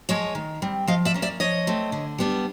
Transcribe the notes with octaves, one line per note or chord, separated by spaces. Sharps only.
F3 G#3 C#5 D#5
D#3
G3 C4
F3 D#5 F5
D5 E5
A#3 C#4
D5 E5
F3 C#5 D#5
A3 C4
D3
G3 B3 D4